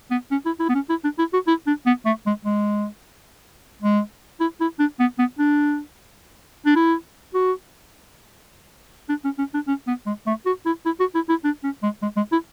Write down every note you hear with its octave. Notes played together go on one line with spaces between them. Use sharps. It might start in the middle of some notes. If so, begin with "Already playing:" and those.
B3
C#4
E4
E4
B3
C#4
E4
D4
E4
F#4
E4
D4
B3
A3
G#3
G#3
G#3
E4
E4
D4
B3
B3
D4
D4
E4
F#4
D4
C#4
C#4
D4
C#4
B3
G#3
A3
F#4
E4
E4
F#4
E4
E4
D4
C#4
G#3
G#3
G#3
E4